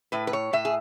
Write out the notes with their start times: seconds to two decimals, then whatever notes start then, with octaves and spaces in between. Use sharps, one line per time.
0.12 A2 B4
0.27 B4
0.33 C#5
0.53 A2 E5
0.65 G#4